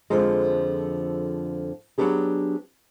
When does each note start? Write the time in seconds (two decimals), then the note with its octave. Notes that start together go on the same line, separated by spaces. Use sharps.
0.10 F2 D3 F3 G#3
1.98 F#3 G#3 B3 D4 G4 G#4